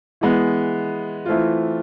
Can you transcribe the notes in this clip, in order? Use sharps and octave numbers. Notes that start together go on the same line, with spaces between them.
E3 G#3 B3
E3 A3 C4 F4